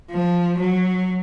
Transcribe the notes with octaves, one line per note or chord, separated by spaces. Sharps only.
F3
F#3